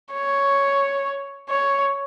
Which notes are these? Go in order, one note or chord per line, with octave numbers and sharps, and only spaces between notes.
C#5
C#5